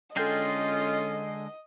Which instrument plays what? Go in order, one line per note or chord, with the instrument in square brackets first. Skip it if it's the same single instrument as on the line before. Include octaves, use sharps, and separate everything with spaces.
[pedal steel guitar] D3 G#3 G5 [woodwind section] C#4 F4 [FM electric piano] A4 C7 [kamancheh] D#5